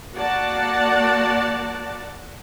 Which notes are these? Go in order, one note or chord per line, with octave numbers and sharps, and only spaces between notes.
A#3 F#4 D5 F#5 A5